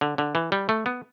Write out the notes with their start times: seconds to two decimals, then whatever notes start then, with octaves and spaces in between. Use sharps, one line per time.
0.01 D3
0.18 D3
0.35 E3
0.52 G3
0.69 A3
0.86 B3